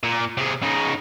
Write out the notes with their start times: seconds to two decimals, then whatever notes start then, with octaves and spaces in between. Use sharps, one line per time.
0.04 A#2
0.37 C3 G#4
0.62 C#3 D#4